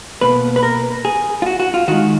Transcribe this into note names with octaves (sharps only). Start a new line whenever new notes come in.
B2 A#3 B4
B4
A#4
G#4
F4
F#4
F#4
F4
D#3 G#3 F#4